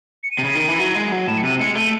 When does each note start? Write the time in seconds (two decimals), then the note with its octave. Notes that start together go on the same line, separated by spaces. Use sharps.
0.23 C#7
0.31 D#7
0.39 C3
0.44 C#3
0.55 D#3
0.68 E3
0.79 F#3
0.96 G#3
1.12 F#3
1.27 A2 E7
1.37 C#7
1.43 C3 D#7
1.60 G#3 C#7
1.75 A3 D#7